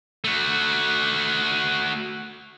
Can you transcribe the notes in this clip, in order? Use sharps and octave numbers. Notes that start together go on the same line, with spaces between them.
A3 F#4